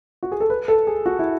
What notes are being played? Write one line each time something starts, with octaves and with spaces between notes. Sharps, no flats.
F#4
G#4
A4
B4
A4
G#4
F#4
E4